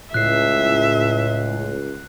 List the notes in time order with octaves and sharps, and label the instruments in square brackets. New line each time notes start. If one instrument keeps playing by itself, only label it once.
[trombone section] C#2 [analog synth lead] A2 [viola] E5 [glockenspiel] F#6 C7